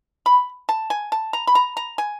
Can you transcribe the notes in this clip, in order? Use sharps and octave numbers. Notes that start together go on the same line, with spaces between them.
B5
A5
G#5
A5
A#5
B5
A#5
A#5
G#5